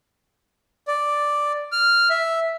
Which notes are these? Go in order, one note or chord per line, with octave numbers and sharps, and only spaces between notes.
D5
F6
E5